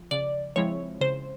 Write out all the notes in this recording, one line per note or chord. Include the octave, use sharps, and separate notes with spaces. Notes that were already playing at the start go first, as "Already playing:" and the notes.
Already playing: F3
C#3 D5
F3 G#3 C4 E4 C#5
C#3 C5